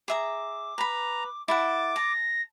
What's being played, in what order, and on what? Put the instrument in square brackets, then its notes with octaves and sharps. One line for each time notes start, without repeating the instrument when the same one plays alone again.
[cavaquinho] G#4 E5 A#5 [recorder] D6
[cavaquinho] B4 B5 [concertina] A#5
[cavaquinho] E4 A4 F#5 [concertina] D6 [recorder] A6
[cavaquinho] A5 [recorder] A#6